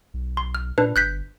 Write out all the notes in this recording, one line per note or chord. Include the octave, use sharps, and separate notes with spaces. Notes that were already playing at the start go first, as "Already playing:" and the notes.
B1
C6
F6
A#2 D4 B4
G1 F#6 G6 B6